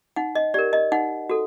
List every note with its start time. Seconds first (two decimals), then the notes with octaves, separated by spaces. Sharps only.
0.16 D#4 F#5
0.35 D#5
0.54 G4 A#4 D5
0.73 D#5
0.92 D#4 F#5
1.30 F#4 A4